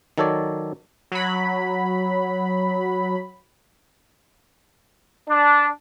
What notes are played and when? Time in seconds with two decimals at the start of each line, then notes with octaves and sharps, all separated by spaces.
0.18 D#3 F#3 A4 C#5 D5
1.12 F#3 B5
5.28 D4